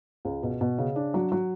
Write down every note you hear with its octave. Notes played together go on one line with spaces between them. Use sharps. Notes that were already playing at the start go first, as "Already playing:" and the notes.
C#2
B2
B2
C#3
D4
F#3
F#3